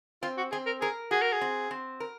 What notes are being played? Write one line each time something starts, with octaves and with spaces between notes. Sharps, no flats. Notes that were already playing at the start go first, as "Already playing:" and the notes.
C4 F4
F#4
C4 G#4
A#4
G#4 A#4
F#4 G#4
A#4
G#4
C4
C4
A#4